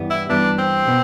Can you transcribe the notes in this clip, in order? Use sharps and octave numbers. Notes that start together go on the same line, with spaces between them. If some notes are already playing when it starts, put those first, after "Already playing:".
Already playing: G2 E3 G3 B3
E4
G2 E3 G3 B3 D4
C4
B2 B3